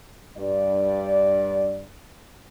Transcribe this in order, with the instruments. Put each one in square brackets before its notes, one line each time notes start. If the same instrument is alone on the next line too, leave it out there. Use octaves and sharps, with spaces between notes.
[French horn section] G2 D5